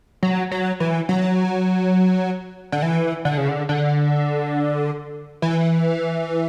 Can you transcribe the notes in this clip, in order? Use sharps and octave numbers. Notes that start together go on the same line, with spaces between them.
F#3
F#3
E3
F#3
D3
E3
D3
C#3
D3
D3
E3